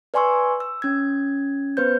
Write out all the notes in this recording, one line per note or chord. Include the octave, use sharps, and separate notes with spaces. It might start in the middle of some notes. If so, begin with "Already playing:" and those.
B4 D5 G#5 C6 C#6 E6
E6
C#4 G#6
B3 B4 C5 G6